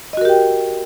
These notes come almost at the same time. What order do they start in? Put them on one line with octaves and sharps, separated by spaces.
D#5 F#4 A#4 G4 G5